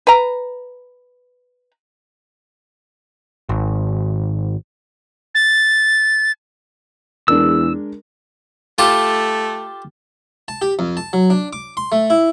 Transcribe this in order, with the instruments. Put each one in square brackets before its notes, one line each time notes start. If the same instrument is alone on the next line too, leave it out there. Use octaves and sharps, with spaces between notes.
[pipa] B4 A#5
[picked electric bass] G#1
[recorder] A6
[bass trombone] E2 [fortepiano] G#3 D4 A#4 [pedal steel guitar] E6
[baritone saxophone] A3 [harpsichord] F4 G4 A4
[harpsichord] A5
G4
F2
A5
F#3
D4
D6
C6
A3
E4